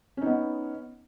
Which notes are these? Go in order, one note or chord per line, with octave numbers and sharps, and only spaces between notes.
B3 C#4 D#4